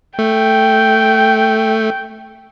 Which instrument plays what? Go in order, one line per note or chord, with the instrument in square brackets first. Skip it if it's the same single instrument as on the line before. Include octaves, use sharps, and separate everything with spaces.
[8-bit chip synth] A3 [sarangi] G5